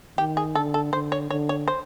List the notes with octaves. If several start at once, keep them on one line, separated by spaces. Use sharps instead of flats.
D#3 G4
G#4
D3 A4
A4
D3 C5
C#5
D3 C#5
C#5
C5